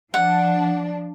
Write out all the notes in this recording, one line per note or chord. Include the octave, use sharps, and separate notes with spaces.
F3 D4 F#5